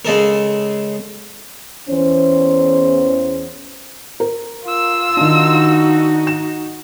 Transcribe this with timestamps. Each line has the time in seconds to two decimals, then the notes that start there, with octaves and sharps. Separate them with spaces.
0.05 C#3 G#3 A4 A#4
1.89 E2 C#4 C5
4.20 A#4
4.64 F4 E6
5.17 D#3 D4 D#4 F#4
6.27 E7